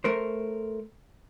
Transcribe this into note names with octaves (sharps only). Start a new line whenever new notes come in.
A3 A#4 C5